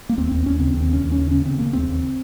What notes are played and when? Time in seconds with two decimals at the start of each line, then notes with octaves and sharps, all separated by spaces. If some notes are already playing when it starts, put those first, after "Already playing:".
0.09 A#3
0.18 D#2 C4
0.31 D#2 C4
0.46 D#2 C#4
0.59 C#3 C4
0.74 D#2 C4
0.88 C#3 C#4
1.03 D#2
1.12 C#4
1.18 C#3
1.31 C#3 C#4
1.45 C#3 C4
1.58 C#3 A#3
1.73 D#2 C4
1.88 D#2